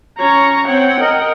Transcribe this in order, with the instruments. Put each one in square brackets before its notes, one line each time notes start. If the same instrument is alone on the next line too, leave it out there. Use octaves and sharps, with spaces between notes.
[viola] C#4 C#5 [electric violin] A#5 C#6
[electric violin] C4 C#5 [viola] F#5 G5
[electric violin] A#4 D#5